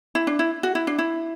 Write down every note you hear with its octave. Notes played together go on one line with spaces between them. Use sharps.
E4
D4
E4
F#4
E4
D4
E4